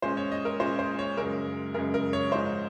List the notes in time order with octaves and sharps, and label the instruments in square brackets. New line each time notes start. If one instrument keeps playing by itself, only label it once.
[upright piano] A#2 G#3 C#4 C5
C#5
D#5
A#4
A#2 G#3 C#4 C5
C5
C#5
F#2 C#3 G#3 A#4
F#2 C#3 G#3 A#4
A#4
C#5
G#2 F3 G#3 D#4 C5